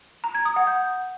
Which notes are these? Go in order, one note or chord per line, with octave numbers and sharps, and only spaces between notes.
A#5
G#6
D#6
F#5
G6